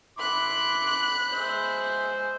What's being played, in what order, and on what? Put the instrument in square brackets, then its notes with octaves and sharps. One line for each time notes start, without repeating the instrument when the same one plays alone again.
[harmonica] E4 C6 D6 [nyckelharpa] B5 [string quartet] F#6
[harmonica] G#3 E5 [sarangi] C5